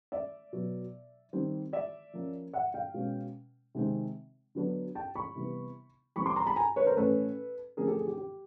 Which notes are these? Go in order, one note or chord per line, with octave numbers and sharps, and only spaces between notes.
D5 E5
B2 F#3 B3
D#3 G3 C4
D5 E5
F3 A#3 C#4
E5 F#5
F5 G5
B2 G#3 C#4
C3 D#3 G#3 C4
D3 F#3 B3 D4
G5 A5
B5 C#6
C3 E3 G3 B3
E3 G3 C4 B5 C#6
C6 D6
A#5 C6
A5 B5
G#5 A#5
B4 C#5
A#4 C5
A2 E3 A3 C#4 A4 B4
D3 F3 A3 C4 G#4 A#4
G4 A4
G#4
G4
G4